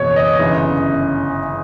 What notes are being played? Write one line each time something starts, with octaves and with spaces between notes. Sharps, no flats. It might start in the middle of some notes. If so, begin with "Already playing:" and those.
Already playing: F#1 E2 B2 C#5
D#5
G1 F#2 C#3 E3